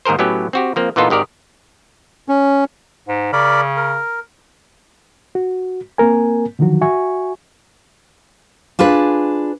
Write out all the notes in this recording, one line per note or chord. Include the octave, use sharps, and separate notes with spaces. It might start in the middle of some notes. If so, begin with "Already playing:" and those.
D#2 G#2 G#4 A#4 C5
A2 F#3 A3 B3 C#4 G4
C4 F#4 G4
F3 A#3 C4
A#2 E3 B3 D#4 F4 A4
G#1 D#3 G4 A#4 D5
C#4
G#2
C#3 A#4 D5 B5
A#4
F#4
A#3 C4 A#4 G#5
D3 D#3 F3 F#3 F#4
F#4 E5 G#5 C#6
D4 F4 G#4 B4